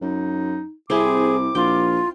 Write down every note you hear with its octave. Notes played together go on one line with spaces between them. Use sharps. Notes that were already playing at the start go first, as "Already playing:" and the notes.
F#2 D#4
C2 C4 E4 G#4 D6
A#1 F4 G5